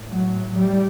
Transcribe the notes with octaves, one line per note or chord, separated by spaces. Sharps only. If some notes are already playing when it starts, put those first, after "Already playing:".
Already playing: A2
F#3
G3